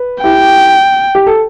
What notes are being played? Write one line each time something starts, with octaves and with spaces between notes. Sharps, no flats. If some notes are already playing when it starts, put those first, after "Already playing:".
Already playing: B4
E4 G4 G5
G4
A4